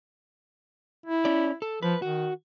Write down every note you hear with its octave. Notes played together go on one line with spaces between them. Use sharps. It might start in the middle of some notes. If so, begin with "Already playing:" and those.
E4
C#4 D5
A4
F3 B4
D#3 F#4